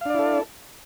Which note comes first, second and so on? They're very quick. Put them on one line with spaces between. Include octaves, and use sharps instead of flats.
F5 D4 D5 E4 A4